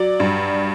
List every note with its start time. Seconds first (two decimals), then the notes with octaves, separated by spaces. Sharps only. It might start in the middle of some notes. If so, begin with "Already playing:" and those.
Already playing: F#3 D5
0.20 G2